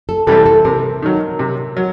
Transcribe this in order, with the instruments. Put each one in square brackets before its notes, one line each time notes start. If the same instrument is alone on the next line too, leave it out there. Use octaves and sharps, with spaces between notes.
[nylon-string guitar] A4
[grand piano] C3 E3 G3 C4 [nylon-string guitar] A4
[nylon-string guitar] A4
[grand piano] C3 [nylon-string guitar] A#4
[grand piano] D#3 F#3
C3
F#3